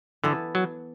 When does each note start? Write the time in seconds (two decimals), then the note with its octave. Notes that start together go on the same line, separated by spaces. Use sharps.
0.24 D3 E3 B3 E4 A4
0.55 F#3